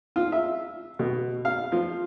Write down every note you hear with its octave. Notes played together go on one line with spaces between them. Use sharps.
F4
E5
B2
F5
F3